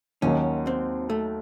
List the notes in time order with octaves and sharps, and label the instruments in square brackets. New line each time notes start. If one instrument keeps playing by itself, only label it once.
[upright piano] D#2 D#3 F#3 [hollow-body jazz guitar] C#4
[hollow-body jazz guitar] C4
A3